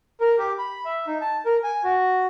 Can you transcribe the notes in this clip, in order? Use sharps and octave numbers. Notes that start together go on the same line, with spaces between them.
A#4
G4
B5
E5
D#4
A5
A#4
G#5
F#4